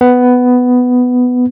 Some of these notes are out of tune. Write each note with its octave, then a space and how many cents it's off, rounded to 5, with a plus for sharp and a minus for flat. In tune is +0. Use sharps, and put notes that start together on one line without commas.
B3 +10